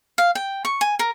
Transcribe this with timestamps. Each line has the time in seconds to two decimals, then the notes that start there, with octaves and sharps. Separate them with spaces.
0.18 F5
0.35 G5
0.65 C#6
0.81 G#5
0.99 A#4